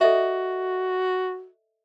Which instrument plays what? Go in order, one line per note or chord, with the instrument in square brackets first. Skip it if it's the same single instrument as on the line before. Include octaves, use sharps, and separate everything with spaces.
[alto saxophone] F#4 [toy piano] A4 D#5 E5